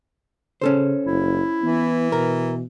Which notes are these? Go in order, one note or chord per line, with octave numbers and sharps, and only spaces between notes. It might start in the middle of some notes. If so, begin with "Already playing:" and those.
C#3 C#4 A4 C5
F#1 E4
E3 B3
B2 A#4